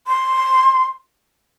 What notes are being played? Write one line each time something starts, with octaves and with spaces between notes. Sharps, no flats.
C6